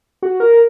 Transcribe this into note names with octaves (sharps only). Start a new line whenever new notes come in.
F#4
A#4